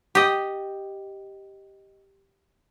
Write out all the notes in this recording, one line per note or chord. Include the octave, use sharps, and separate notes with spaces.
G4 D#5